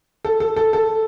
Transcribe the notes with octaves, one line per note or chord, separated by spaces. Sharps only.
A4
A4
A4
A4